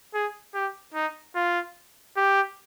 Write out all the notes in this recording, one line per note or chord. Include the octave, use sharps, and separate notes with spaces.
G#4
G4
D#4
F4
G4